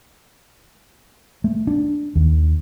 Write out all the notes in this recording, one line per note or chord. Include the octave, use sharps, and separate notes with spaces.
A3
D4
D#2